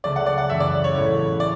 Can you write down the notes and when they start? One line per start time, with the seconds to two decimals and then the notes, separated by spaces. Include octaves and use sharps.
0.04 C#2 C#3 F#3 A3 D5
0.16 F#5
0.26 D5
0.38 F#5
0.49 F#2 E3 G#3 C#4 E5
0.60 D5
0.84 C#5
0.94 A1 A2 G#3 B3 E4
1.40 D5